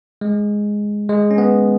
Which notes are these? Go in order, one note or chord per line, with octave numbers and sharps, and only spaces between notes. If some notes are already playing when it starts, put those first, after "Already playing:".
G#3
G#3
C#4
B3